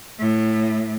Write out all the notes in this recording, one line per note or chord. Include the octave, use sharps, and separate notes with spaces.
A2